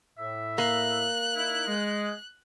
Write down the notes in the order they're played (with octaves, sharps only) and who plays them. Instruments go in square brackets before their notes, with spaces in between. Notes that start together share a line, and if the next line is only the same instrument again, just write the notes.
[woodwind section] A2 E5
[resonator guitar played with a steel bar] A#3 [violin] F#6
[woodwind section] D#4 E4
G#3